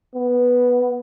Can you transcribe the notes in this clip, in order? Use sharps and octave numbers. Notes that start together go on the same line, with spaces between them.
B3